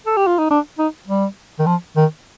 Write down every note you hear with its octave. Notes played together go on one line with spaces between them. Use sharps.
A4
G4
F4
D#4
D4
D#4
G3
D#3
F3
D#3